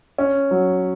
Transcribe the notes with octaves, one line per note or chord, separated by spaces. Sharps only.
C#4
F#3